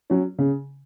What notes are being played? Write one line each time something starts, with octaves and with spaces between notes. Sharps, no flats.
F#3 C#4
C#3